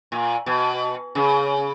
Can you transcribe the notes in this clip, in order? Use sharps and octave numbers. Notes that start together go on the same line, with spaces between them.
A#2
B2
C#3